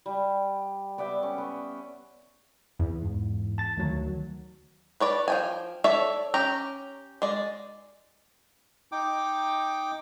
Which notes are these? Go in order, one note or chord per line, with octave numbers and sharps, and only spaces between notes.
G3
B3 D5 E5 G5
C#4
B3
E2
G#2
A5 A6
D2 D#3 F#3
B4 C#5 D5
F3 G5 G#5
A4 C#5 D5 E5
C#4 G4 G5 A#5
G#3 D5
D#4 G5 D6